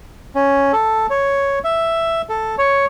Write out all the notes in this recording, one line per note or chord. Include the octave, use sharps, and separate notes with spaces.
C#4
A4
C#5
E5
A4
C#5